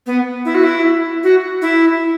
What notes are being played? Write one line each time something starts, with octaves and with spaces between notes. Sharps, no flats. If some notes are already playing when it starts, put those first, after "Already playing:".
B3
E4
F#4
E4
F#4
E4